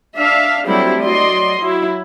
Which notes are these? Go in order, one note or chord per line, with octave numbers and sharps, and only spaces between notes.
D4 E5 F5
F#3 G3 A3 C4 D4 E4
F#3 D5 D#5 C6
F#3 E4